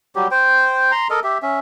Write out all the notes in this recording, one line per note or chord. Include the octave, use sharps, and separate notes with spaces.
F#3 G3 G4
C5 G5
A#5 C6
A4 A#4 D#5
G4 E5
C#4 E5